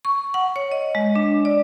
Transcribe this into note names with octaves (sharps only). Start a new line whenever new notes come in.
C#6
F#5
C#5
D#5
G#3
D4
D5